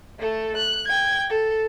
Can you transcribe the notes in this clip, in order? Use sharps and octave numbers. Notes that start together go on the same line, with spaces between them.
A3 A4
F#6
G5 G#6
A4